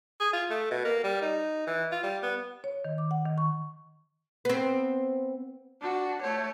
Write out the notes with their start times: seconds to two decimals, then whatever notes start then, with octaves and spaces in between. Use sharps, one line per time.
0.20 G#4
0.33 F4
0.50 A3
0.71 B2
0.84 A#3
1.04 G3
1.22 D#4
1.67 E3
1.92 F4
2.03 G3
2.22 B3
2.64 C#5
2.85 D#3
2.98 D6
3.11 F#5
3.25 D#3
3.38 C#6
4.45 B3 C4
5.81 D4 F#4
6.22 A3 C#5